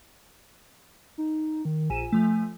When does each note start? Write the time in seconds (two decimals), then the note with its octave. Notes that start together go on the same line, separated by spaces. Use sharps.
1.18 D#4
1.65 D#3
1.90 A#1 G#5 D#7 E7
2.12 F3 A3